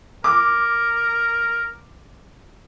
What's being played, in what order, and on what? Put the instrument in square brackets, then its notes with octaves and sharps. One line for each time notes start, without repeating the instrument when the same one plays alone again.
[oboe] A#4 [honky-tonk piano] D6